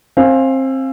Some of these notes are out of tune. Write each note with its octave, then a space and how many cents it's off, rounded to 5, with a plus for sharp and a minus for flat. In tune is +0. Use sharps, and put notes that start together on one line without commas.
C4 +25 F5 +0 G#5 +0